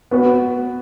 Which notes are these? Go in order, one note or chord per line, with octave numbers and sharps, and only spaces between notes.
B3 F#4 B4